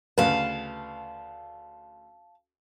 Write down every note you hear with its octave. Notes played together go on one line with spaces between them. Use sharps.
D2 C#3 B4 F5 A5